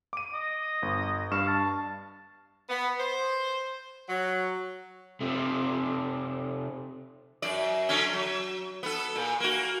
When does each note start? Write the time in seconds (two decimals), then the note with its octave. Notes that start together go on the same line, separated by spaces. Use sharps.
0.13 D6 D#7
0.33 D#5
0.82 G1
1.31 G2 F5 C#6 E7
1.48 A5
2.69 B3
2.99 C5
4.09 F#3
5.20 C3 A3
7.42 F#2 D5
7.89 D3 F#3 C#4
8.13 F#3
8.83 B3 A4
9.15 A#2
9.40 A#3 F#4